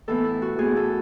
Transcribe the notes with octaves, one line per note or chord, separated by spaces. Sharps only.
A2 E3 B3 A4
E4
F#4
A2 E3 B3 G#4
A4